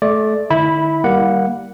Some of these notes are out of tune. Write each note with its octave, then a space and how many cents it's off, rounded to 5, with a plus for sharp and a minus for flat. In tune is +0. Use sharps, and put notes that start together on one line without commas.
A3 -25 D5 +0
D3 +40 E4 -20 B5 +0
G3 -10 A#3 +10 F#5 +0